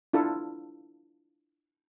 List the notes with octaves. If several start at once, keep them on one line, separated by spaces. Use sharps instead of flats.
D4 E4 F4 A4